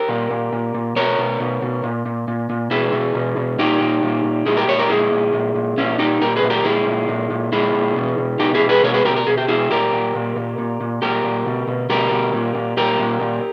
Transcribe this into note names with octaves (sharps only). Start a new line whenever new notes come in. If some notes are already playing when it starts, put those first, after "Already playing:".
Already playing: G4 A#4
A#2
A#2
A#2
A#2
B2 A#4 C#5
B2
B2
B2
A#2
A#2
A#2
A#2
B2 E4 G#4
B2
B2
B2
A#2 D#4 G4
A#2
A#2
A#2
A#2 E4 G#4
G4 A#4
A#2 A#4 C#5
G4 A#4
A#2 E4 G#4
A#2
A#2
A#2
A#2 C#4 E4
A#2 D#4 G4
A#2 G4 A#4
G#4 B4
A#2
G4 A#4
A#2 E4 G#4
A#2
A#2
A#2
A#2 E4 G#4
A#2
B2
B2
B2 D#4 G4
E4 G#4
B2
G#4 B4
B2 A#4 C#5
G#4 B4
B2 G4 A#4
A#4
B2 G#4
G4
B2 E4 G#4
A#2 G4 A#4
A#2
A#2
A#2
A#2
A#2
A#2 G4 A#4
A#2
B2
B2
B2 G4 A#4
B2
A#2
A#2
A#2 G4 A#4
A#2
A#2